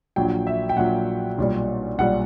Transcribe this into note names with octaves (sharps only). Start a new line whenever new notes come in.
A#1 A#2 F#3 G5
E5
G5
A#1 A#2 F#3 F#5
B1 A#2 G3
B1 A#2 G3 F#5